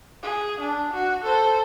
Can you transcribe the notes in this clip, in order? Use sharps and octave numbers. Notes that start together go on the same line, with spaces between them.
G#4
D4
F#4
A4 C5